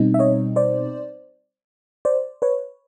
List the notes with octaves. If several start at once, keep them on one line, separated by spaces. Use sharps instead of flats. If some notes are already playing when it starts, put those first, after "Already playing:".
Already playing: B2 G3 C4 D#4
E5
C#5 D#5
C5 D5
C5 D5
B4 C#5